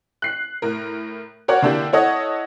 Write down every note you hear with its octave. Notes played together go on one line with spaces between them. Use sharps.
F#6 C7
A2 A#4
F#4 A#4 C#5 D5 F#5
D3 A#3 D4 E4 G4
E4 A4 C#5 D#5 F#5